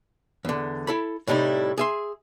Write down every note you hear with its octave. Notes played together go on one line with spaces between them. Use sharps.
E2 D3
E4 A4 B5
A2 C3 G3 D#4 E4
G#4 E5 C6